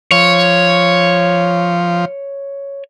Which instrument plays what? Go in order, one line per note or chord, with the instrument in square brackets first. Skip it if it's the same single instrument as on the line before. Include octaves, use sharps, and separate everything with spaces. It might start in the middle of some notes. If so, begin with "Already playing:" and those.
[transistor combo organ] F3 [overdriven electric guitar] C#5